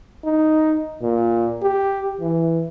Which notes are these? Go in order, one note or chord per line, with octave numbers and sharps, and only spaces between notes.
D#4
A#2
G4
E3